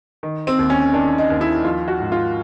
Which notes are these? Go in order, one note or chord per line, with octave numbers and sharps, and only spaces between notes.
D#3
C4
D#2
C#4
D#3 D4
D#4
D#2
E4
F3 F4
F#4
G#2
F4